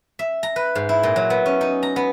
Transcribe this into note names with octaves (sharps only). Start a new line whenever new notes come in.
E5
A#5
B4
G#2
E4
A#2
F#3
B3
C#4
D#4
A#5
B3